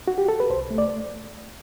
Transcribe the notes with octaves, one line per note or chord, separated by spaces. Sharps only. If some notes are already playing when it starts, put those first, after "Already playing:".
F#4
G4
A4
B4
C2 C5
A3
D5